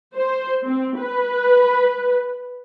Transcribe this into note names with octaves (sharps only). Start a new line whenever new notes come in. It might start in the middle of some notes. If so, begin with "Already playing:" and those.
C5
C4
B4